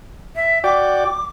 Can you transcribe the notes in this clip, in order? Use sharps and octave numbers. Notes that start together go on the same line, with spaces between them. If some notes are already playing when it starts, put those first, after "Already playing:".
E5
F#4 D5 G5 D6